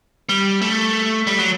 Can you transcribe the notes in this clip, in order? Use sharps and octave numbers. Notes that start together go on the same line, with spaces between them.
G3
A3
G3
F#3